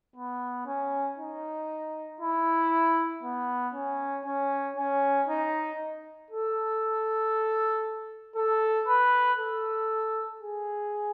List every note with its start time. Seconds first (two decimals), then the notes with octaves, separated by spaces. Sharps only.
0.16 B3
0.66 C#4
1.18 D#4
2.21 E4
3.23 B3
3.74 C#4
4.26 C#4
4.77 C#4
5.28 D#4
6.30 A4
8.36 A4
8.88 B4
9.39 A4
10.41 G#4